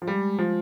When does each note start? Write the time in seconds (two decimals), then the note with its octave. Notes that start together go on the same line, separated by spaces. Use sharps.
0.02 F3
0.07 G3 G#3
0.23 G#3
0.39 F3 F4